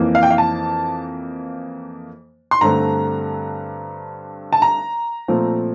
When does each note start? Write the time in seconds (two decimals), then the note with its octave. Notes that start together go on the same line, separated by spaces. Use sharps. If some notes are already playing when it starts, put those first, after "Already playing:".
Already playing: F2 E3 A#3
0.15 F5
0.23 G5
0.30 F5
0.38 A5
2.51 C6
2.61 G2 D3 A3 C4 A#5
4.53 A5
4.62 A#5
5.28 A#2 F3 A3 C4